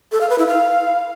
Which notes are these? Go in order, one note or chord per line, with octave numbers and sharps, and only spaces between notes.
A4
F5
B4
E4
F5